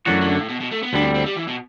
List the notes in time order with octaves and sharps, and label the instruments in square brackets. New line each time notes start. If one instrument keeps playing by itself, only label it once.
[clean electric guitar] F#2 F#3 A3 D4 F#4 [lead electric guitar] E3
[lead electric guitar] E3
D3
A2
B2
B2
A3
B3
[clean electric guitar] D2 D3 G3 [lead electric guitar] D4
[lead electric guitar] C4
C4
G3
E3
B2